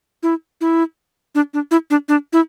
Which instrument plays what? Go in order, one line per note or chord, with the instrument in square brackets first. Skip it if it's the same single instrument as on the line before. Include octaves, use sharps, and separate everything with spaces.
[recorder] E4
E4
D4
D4
E4
D4
D4
E4